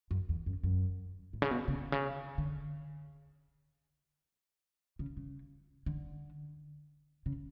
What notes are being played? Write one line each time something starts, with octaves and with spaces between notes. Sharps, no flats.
F#2
E2
F#2
F#2
A2
C#3
B2
C#3
B2
C#3
D3
C#3
C#3
D3
C#3